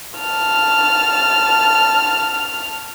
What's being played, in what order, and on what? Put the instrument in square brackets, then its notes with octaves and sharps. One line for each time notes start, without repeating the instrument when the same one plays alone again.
[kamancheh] A5 F6